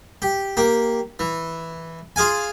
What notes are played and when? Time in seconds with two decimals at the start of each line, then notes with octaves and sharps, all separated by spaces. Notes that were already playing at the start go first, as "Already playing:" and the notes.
0.22 G4
0.57 A#3 G4
1.19 E3
2.16 F4 G#4 F5 G#5